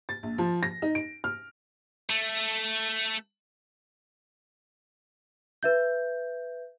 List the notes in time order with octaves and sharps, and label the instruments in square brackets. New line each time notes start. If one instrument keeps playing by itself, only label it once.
[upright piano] A6
A#1
F3
A#6
D#4
D7
F6
[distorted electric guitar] A3
[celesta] B4 E5 G6